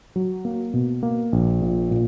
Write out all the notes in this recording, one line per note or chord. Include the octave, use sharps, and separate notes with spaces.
F#3
A#3
B2
A#3
A#1
A#2
A#2